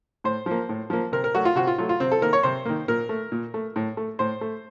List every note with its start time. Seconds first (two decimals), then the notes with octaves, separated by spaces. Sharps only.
0.24 A2 C5
0.46 F3 A#3
0.69 A2
0.90 F3 A#3
1.12 C3 A#4
1.24 A#4
1.34 F#3 A3 F#4
1.45 F4
1.56 C3 F#4
1.67 F4
1.78 F#3 A3 F4
1.89 F4
2.00 C3 C4
2.12 A4
2.22 D#3 A#3 A#4
2.33 C#5
2.43 C3 C5
2.66 D#3 A#3
2.88 A#2 A#4
3.09 A3
3.32 A#2
3.54 A3
3.76 A2
3.97 A3
4.19 A2 C5
4.41 A3